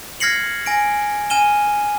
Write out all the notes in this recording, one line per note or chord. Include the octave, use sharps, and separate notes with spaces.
F6 G#6 A#6 C7 C#7 F#7
G#5 A#6 D7
G#5 F6 D#7 E7 G7